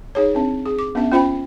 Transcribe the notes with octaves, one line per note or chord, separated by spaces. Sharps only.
D#4 G#4 C#5
C4 D4
G#4
D6
B3 C#4 D4 E5
C#4 F4 C5 G5 B5